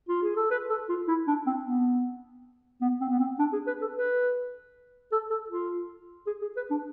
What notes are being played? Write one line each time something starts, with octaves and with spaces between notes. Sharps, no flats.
F4
G#4
A4
B4
A4
F4
E4
D4
C4
B3
B3
C4
B3
C4
D4
G#4
B4
A4
B4
A4
A4
F4
G#4
G#4
B4
D4